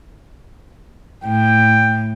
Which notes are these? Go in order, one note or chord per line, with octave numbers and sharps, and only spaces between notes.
A2 G5